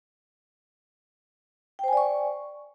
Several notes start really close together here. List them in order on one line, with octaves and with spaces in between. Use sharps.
G5 C5 G#5 D5 C#6